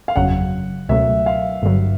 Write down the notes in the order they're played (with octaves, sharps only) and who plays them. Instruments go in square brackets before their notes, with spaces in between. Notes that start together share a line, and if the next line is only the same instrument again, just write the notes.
[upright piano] F5
[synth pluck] G1 F2 C#3 F#3 [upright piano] F#5
[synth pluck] C#2 B2 F#3 A3 [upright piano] E5
[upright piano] F5
[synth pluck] G1 G2 D3 F#3